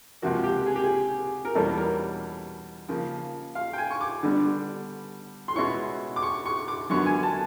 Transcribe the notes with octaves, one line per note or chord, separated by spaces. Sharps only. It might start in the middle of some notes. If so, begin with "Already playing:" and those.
C#2 C3 F3 A#3 F#4
G4
G#4
G4
G#4
A#4
E2 B2 G3 A#3 C#4 A4
A#4
C#3 F3 A#3
F5
G5
G#5
C#6
D6
D3 G3 B3
C6
B2 G#3 C#4 E4 C#6
D6
C#6
C#6
D6
F#2 D3 F#3 B3 C#6
G#5
A5